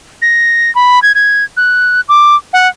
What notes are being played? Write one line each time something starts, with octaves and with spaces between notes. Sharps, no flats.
A#6
B5
G#6
G#6
F#6
D6
F#5